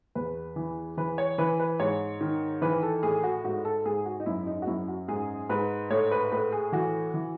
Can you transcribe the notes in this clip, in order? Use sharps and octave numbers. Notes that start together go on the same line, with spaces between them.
E2 B4
E3
E3 B4
C#5
E3 B4
B4
G#2 C#5
D#3
E3 B4
A4
A2 G#4
F#4
G#2 F#4
A4
G#2 G#4
F#4
D#4
F#2 E4
D#4
F#4
F#2 E4
F#4
G#2 G#4
G#2 B4
A2 C#5
B4
A2 B4
G#4
E3 F#4
E3